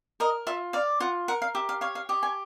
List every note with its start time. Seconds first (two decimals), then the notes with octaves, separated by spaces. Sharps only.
0.20 A#4 D#5
0.47 F4 E5
0.73 D5 F5
1.00 F4 F#5
1.28 A#4 F#5
1.42 F5
1.55 G4 E5
1.69 F5
1.81 C#5 F5
1.95 F5
2.09 G4 D#5
2.23 G#5